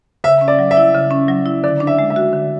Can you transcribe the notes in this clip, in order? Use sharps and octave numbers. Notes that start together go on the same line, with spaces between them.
C#3 E5
C#4
D5
F#3
E5
E4
C#3
C#4
F#3
E4
D3 D5
D4
E5
G#3
E5
F#4
D3